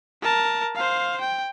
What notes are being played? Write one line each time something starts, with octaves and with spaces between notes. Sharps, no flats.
A#4 A5
C5 F5
G5